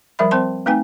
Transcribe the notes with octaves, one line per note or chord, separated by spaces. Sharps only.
F3 G3 A#4 E5 B5
C4 C5 G5 A5 C6
A3 C4 D#4 B4 G5 G#5